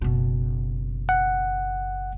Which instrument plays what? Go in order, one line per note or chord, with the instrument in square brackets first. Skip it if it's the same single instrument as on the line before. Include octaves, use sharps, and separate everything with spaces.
[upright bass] F#1 B2
[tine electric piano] F#5